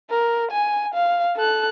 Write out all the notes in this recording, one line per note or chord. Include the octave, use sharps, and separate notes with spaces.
A#4
G#5
F5
A4 F#6